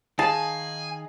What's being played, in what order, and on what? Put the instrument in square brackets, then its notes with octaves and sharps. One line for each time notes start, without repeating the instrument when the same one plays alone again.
[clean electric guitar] D#3 D#4 F5 [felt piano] G#4 [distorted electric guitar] G#5 [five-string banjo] A5